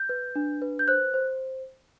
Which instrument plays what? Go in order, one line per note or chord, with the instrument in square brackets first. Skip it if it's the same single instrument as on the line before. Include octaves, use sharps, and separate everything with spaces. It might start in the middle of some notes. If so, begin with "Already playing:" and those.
Already playing: [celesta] G6
B4
D4
B4
G6
C5 F#6
C5